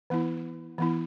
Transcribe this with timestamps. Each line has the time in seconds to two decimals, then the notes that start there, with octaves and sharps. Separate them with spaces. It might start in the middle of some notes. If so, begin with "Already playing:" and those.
0.10 E3 B3 E4
0.78 E3 B3 E4